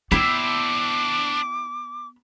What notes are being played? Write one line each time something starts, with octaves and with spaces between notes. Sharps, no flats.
B3 D4 E4 G4 C5 D6